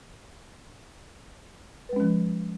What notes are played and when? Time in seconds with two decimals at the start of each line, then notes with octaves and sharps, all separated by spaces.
1.89 B4
1.93 G#3
1.96 C#4
2.00 F3